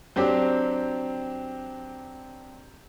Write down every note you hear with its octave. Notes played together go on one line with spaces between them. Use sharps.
F#3 C4 D4 G4